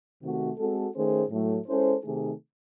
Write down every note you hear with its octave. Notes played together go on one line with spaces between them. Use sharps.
C3 D#3 A3 C4 F#4
G#3 C4 F#4 A4
D#3 A3 C#4 G#4 C5
A2 F#3 A3
G#3 C#4 E4 A4 C5
C3 D#3 A3 D#4 G#4